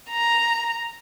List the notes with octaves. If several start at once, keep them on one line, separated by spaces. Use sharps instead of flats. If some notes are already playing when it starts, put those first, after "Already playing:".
A#5